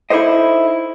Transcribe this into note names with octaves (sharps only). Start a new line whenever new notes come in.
D#4 E4 G4 A4 C5 D#5